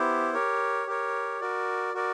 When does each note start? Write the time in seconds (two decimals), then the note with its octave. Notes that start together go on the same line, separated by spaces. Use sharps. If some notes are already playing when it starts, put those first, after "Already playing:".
Already playing: B3 E4 G4 C5
0.34 G4 A#4 C#5
0.87 G4 A#4 C#5
1.41 F#4 A#4 D5
1.94 F#4 A#4 D5